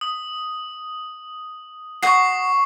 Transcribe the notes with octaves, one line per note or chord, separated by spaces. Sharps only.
D#6
F#4 C#6 D#6 C7